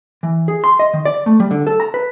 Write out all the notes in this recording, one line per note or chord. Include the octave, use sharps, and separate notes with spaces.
E3
G#4
C6
D#5
D#3
D5
A3
G3
D3
A4
A#5
B4